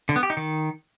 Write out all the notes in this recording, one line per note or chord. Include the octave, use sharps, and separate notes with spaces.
D3
B3
G4
D#4
D#3